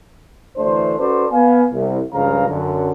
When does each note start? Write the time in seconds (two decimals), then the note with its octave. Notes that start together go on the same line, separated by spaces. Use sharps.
0.57 D2 E3 A3 D4 C5
0.99 C#4 F#4 A4 B4 C5 D5
1.31 B3 F5 G#5
1.73 C2
2.13 C#2 G2 C#3 F3 F5 A#5
2.48 F#2 D3